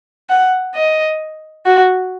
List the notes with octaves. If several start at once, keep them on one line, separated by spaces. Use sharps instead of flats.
F#5
D#5
F#4